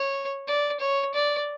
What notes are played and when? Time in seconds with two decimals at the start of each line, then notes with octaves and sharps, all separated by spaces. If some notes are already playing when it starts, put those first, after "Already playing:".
Already playing: C#5
0.47 D5
0.80 C#5
1.14 D5